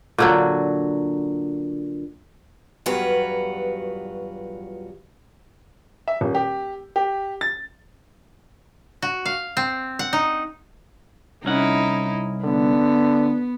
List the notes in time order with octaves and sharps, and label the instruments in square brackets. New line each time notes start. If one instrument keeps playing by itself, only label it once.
[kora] A#2 D3 F#3
[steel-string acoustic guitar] E2 G2 F#3 F4 F#4 B4
[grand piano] E5
D#1
G4
G4
A6
[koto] F#4
F5
C4
F#5
D#4
[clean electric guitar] C2 C#4 F#5 [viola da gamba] D#4 E4
[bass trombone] D3 [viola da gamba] B3